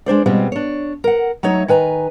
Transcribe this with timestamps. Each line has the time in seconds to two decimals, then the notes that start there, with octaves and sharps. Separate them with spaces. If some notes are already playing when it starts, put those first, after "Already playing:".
0.06 G#3 D4 C5 D5
0.26 B2 G3 G#3 C4 F4
0.52 D4 C#5
1.04 A#4 F#5
1.43 F#3 A3 D#4 C#5
1.68 D#3 B4 G#5 A#5